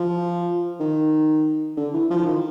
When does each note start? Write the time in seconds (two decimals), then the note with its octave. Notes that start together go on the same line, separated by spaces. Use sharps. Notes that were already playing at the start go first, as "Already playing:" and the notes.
Already playing: F3
0.80 D#3
1.77 D3
1.94 E3
2.11 F3
2.26 D#3